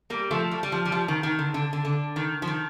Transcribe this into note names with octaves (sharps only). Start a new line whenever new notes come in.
G3 A#3
F3 A3
G3
G3
F3
G3
F3
D#3
D#3
D3
D3
D3
D3
D#3
F3
D#3